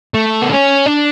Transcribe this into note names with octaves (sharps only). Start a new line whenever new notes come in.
A3
B3
C#4
D4